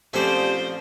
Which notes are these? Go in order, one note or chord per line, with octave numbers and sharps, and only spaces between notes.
A#2 F3 A3 C4 C#4 G4 C5 D5